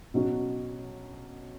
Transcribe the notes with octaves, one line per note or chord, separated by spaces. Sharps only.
B2 F#3 C#4 F#4